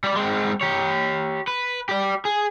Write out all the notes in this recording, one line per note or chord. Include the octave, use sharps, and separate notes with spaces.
G3 D5
G#3 C4
G4 C#5
B4
G4 D5
G#4